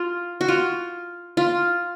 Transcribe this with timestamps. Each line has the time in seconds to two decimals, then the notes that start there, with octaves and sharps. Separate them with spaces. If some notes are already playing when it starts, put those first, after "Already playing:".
Already playing: F4
0.41 F#4
0.48 F4
1.37 F4